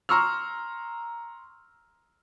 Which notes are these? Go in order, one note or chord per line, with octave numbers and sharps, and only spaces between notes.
A#5 C6 C#6 E6 F6